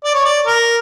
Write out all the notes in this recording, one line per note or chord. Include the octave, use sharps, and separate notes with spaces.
D5
C#5
D5
A#4